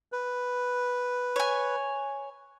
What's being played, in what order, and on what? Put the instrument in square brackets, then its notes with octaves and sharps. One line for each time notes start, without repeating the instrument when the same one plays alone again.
[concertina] B4
[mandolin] C#5 G#5